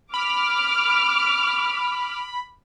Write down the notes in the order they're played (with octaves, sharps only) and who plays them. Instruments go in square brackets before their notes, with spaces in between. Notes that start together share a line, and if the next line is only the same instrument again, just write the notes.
[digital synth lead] B5 [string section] D6 F6